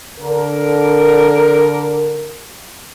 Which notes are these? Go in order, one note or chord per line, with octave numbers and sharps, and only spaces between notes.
D3 A#4